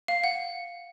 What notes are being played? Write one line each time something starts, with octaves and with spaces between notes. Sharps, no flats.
F5
F#5